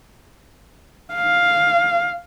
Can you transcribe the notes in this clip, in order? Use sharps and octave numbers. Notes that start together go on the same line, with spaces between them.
F5